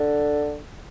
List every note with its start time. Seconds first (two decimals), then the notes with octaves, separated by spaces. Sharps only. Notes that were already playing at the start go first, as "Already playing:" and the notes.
Already playing: D3